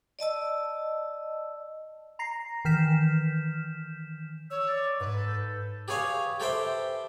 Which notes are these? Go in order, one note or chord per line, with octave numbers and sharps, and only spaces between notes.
D5 D#5 A5 E6
A#5 A#6 C7
D#3 E3 F6 G6 B6 E7
C#5 E6
D5
G#2 B4
A4
G6
G4 G#4 B4 C#5 F5 G#5
G4 A4 B4 C5 E5 G5